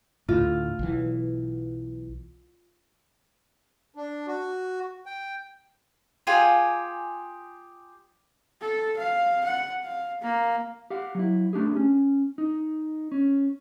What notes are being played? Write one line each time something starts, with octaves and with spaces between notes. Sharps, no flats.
D2 A2 F4
B1 E3
D4
F#4
G5
F4 G4 G#4 G#5
A4
F5
F#5
F5
A#3
G4 F5 F#5
F#3 E4
A3 D4 G4 G#4
C#4
D#4
C#4